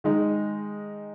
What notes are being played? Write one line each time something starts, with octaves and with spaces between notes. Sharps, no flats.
D#3 G#3 D#4